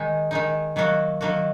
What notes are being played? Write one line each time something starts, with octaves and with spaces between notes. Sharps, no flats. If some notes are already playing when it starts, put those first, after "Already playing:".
Already playing: D#3 G#3 D#4
D#3 G#3 D#4
D#3 F#3 A#3 F#4
D#3 F#3 A#3 F#4